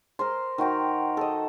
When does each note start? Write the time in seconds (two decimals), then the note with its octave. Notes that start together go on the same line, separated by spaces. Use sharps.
0.19 A#4 C5 C6
0.58 D#3 F#4 G5 A#5
1.17 A4 D#5